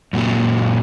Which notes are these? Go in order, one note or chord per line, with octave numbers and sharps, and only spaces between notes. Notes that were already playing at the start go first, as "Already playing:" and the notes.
F#2 A#2 F#3